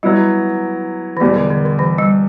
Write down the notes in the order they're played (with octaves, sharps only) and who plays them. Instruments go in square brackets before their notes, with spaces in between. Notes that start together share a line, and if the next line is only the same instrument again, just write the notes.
[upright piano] F#3 B3 E4 [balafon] G3
[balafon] E3
[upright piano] E2 B2 G3 [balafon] F#3
[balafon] D3
D3
D3
E3
G3